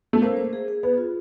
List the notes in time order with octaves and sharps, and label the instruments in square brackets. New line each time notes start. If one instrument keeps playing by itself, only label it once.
[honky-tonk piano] A3
[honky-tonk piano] A#3 [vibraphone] C5
[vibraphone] C5
G#4
G#4
[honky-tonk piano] B3 [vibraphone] G#4
[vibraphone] F4